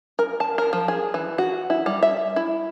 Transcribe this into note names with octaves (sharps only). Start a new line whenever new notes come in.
A#4
A5
A#4
F3
G#4
E3
F#4
E4
G3
E5
E4